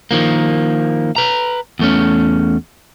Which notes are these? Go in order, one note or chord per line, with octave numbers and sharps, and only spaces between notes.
D#3 F3 A#3
B4 A#5
E2 A3 C#4